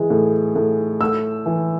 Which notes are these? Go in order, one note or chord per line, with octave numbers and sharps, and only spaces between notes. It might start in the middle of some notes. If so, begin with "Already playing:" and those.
Already playing: E3 G#3
A2
A2
A3 E6
E3